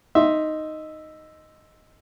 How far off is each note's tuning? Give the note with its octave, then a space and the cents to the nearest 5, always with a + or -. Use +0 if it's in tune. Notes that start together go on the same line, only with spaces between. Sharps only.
D#4 +0 E5 +0 C6 +0